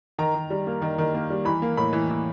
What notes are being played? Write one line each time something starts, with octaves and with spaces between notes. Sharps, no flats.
D#3 A#5
D#3
G3
A#3
D#3
D#3
A#3
G3
E3 B5
A#3
A2 B5
E3
E3